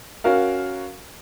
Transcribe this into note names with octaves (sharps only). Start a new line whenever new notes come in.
C#4 F#4 A#4 F5